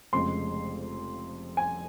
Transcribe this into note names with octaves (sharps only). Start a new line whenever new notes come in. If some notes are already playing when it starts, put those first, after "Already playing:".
F1 F2 C#3 G#3 C6
G#5